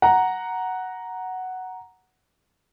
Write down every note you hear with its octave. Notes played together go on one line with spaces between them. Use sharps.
F#5 A#5